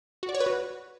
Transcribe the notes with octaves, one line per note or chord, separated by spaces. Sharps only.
F#4
D5
C#5
B4
F#4